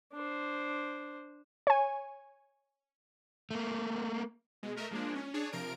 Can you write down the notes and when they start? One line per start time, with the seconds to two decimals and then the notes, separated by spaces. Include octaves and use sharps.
0.13 D4 C5
1.67 C#5 G#5
3.51 A3 A#3
4.63 B2 G#3
4.76 A3 A#4 D#5 E5
4.91 F3 G#3 A#3 D4
5.15 C#4
5.34 D4 G#4 C#5
5.52 C3 F3 A#4 D7